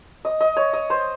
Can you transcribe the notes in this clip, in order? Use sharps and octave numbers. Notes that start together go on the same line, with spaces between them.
D#5
D#5
C#5
D#5
C5